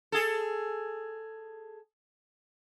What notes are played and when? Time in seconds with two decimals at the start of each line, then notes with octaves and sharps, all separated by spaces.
0.12 G#4 A4